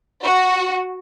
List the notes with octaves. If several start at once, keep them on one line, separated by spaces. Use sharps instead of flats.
F#4